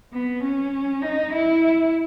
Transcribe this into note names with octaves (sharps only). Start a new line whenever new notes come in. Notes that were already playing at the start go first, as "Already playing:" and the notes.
B3
C#4
D#4
E4